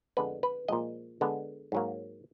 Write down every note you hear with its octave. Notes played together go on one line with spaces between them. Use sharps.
F2 D3 G#3 B3 B4
B4
A#2 F3 G#3 D#5
D3 G#3 B3
G#2 F#3 A#3